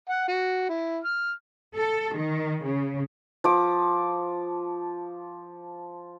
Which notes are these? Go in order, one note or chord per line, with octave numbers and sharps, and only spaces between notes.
F#5
F#4
E4
F6
A4
D#3
C#3
F3 D6